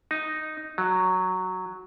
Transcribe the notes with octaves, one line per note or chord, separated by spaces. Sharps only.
D#4
F#3